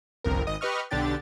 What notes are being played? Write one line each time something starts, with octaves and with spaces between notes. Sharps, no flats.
G1 C2 F2 A#4
G#1 D#5 D#6
G4 B4 D#5 C#6 F6
B1 D3 D4 G4 A6